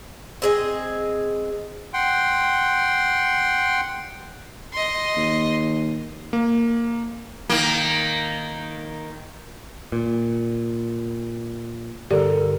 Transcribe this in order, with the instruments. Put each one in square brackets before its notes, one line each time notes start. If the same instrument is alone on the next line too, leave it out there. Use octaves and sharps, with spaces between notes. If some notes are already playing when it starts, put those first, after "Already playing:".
[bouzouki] C4 G#4 D#5
[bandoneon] F#5 G5 C6
[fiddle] D#5 C6
[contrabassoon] D#2
[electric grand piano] A#3
[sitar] D#3 A#3
[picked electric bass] A#2
[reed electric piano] G2 D3 A#4 [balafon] G4 D5 [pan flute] A4